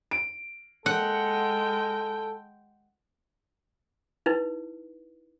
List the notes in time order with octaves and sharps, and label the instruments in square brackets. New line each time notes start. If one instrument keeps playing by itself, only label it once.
[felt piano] D7
[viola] G#3 G5 [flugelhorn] A4 [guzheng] F#5
[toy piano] D#4 E4 B4